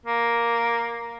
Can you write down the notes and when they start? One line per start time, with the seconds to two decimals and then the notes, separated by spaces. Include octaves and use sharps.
0.06 A#3